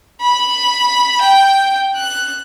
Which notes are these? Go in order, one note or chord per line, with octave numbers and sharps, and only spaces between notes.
B5
G5
F#6